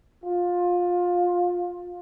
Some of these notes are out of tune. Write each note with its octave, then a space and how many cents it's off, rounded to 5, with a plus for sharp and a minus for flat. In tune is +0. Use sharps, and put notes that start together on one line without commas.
F4 +20